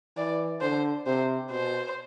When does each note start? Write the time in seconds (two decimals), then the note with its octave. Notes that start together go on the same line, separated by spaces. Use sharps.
0.17 E3 D5
0.61 D3 C5
1.06 C3 C5
1.51 B2 C5